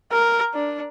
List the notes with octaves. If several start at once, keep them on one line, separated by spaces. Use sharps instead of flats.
A#4
D4